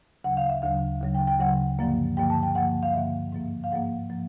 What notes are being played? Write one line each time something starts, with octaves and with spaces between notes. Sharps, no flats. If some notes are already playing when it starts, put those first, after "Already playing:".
D2 C#3 F#3 F#5
F5
E5
D2 C#3 F#3 F5
D2 C#3 F#3
G5
G5
D2 C#3 F#3 F#5
G2 D3 F3 A#3
G2 D3 F3 A#3 G5
A5
G5
G2 D3 F3 A#3 F#5
F5
G2 D3 F3 A#3 E5
G#2 F3 A#3
F5
G#2 F3 A#3 F#5
F3 A#3